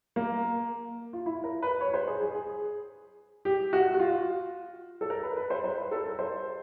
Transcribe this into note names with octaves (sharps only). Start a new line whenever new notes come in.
A#3
F4
E4
A#4
B4
C#5
B4
C5
G#4
G#4
G#4
G4
F#4
F#4
F4
A4
A#4
B4
B4
C5
C5
B4
A4
A#4
C5